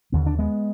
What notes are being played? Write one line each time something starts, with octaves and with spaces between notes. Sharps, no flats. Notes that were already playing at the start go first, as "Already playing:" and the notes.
D#2 D3 B3
D4
G#3 B3